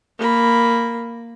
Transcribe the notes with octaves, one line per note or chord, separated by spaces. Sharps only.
A#3 B5